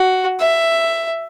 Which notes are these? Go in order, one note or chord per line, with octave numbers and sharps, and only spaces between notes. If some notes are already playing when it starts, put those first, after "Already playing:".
Already playing: F#4
E5